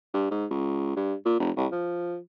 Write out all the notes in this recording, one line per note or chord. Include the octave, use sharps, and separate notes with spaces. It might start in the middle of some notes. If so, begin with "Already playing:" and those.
G2
G#2
C#2
G2
A#2
F1
C2
F3